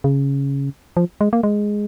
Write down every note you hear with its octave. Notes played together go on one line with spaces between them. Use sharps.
C#3
F3
G#3
A#3
G#3